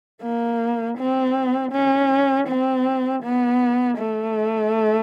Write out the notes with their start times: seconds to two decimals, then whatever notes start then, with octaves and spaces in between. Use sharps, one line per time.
0.22 A#3
0.98 C4
1.72 C#4
2.48 C4
3.23 B3
3.98 A3